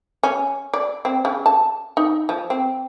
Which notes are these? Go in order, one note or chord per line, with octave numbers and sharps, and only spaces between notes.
C#4
D5
C4
C#3
A5
D#4
F3
C4